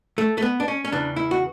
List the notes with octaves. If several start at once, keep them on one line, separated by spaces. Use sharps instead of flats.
A3
A3
B3
D4
C#4
C#4
E2 C#3 E3 D4
E4
F#4